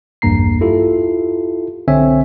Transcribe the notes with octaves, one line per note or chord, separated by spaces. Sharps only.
A#1 E2 G2 A#3 A#5 C7
E4 F4 G4 A4
B1 D3 C4 C#5 E5 G#5